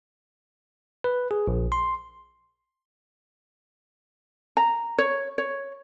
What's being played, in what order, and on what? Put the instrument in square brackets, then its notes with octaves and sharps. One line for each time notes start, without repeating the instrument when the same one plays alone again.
[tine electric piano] B4
G#4
A#1
C6
[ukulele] A#5
C#5
C#5